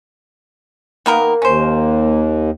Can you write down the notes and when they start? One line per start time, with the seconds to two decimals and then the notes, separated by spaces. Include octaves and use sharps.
1.06 D#3 A#3 B3 A#4
1.42 D#2 C#4 C5